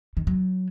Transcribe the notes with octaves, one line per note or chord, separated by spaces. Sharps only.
D#3
F#3